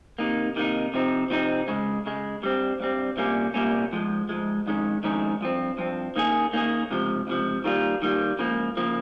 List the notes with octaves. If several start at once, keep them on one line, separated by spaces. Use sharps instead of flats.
C3 D#3 A#3 D#4
C3 D#3 A#3 D#4
C3 F3 C4 D#4
C3 F3 C4 D#4
C#2 C#3 G#3
C#2 C#3 G#3
G2 G3 C4
G2 G3 C4
C2 A#2 G3 A#3 C#4
C2 A#2 G3 A#3 C#4
G#2 F3 G#3
G#2 F3 G#3
F2 D#3 G#3 C#4
F2 D#3 G#3 C#4
G2 F3 C4
G2 F3 C4
D#3 A#3 C#4 G#4
D#3 A#3 C#4 G#4
C#2 C3 F3
C#2 C3 F3
D#3 G3 A#3 F4
D#3 G3 A#3 F4
C#2 C#3 F3 A#3
C#3 F3 A#3